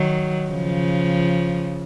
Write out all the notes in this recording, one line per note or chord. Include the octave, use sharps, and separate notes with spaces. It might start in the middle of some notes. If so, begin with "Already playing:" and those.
Already playing: D#3 F#3
C#3 F3